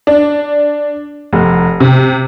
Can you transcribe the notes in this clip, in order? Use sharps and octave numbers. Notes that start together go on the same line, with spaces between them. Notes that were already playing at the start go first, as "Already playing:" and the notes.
D4
F1
C3